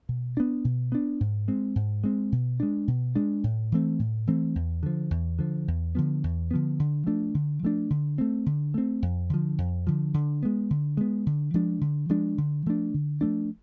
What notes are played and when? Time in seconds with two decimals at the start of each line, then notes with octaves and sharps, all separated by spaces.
0.09 B2
0.37 B3 D4
0.64 B2
0.92 B3 D4
1.20 G#2
1.48 G#3 C4
1.76 G#2
2.04 G#3 C4
2.32 B2
2.60 G#3 D4
2.88 B2
3.15 G#3 D4
3.44 A2
3.72 E3 A3 C4
3.99 A2
4.27 E3 A3 C4
4.55 E2
4.83 D3 F3
5.11 E2
5.39 D3 F3
5.68 E2
5.95 D3 F3 B3
6.24 E2
6.51 D3 F3 B3
6.79 D3
7.07 F3 A3 D4
7.35 D3
7.63 F3 A3 D4
7.90 D3
8.18 A3 C4
8.46 D3
8.74 A3 C4
9.02 F2
9.30 D3 F3
9.58 F2
9.87 D3 F3
10.14 D3
10.43 G#3 B3
10.70 D3
10.97 G#3 B3
11.26 D3
11.54 F3 G#3 D4
11.81 D3
12.09 F3 G#3 D4
12.38 D3
12.66 F3 A3 D4
12.94 D3
13.21 F3 A3 D4